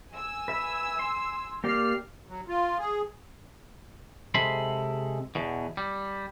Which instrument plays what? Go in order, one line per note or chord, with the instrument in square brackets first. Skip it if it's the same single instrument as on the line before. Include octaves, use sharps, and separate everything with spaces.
[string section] G#5 E6
[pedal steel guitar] B4 E5
C6
[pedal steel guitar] A#3 G4 D5 [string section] F6 C7
[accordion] F#3
F4
G#4
[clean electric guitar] C3 G#3 A4 B5 C6
E2 B2
G3